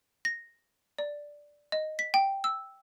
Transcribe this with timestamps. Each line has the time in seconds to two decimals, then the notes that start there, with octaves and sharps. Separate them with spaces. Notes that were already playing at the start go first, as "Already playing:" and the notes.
0.25 A#6
0.98 D5
1.72 D#5
1.99 B6
2.14 G5
2.44 E6